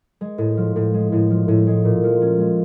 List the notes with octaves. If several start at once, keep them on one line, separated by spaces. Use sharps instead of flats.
G#3
A2
F3
A2
G#3
A2
F3
A2
G#3
A#2
F3
C#4
G#3